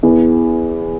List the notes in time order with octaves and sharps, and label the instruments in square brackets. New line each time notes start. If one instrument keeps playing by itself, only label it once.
[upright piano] E2 E3 B3